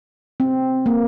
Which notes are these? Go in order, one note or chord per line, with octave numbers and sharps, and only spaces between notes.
C4
A#3